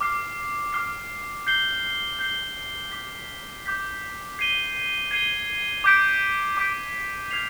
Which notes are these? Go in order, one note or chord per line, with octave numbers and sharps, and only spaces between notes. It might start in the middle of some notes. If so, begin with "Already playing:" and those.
D6 F6 C7
D6 F6 C7
G6 C7 G7
G6 C7 G7
D6 G6 B6
D6 G6 B6
G#6 C7 D#7 G7
G#6 C7 D#7 G7
D6 G6 B6 D7
D6 G6 B6 D7
F6 G#6 C7 F7